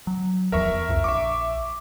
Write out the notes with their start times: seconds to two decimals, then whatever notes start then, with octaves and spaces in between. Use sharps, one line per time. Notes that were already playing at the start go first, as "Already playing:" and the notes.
0.07 F#3
0.52 D1 E2 F3 A#4 E5 C#6
0.89 C2 F2
1.04 A#1 E5 C#6 D6